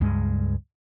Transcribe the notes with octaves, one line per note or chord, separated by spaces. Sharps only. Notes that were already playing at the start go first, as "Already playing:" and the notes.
C#2 G2 G#3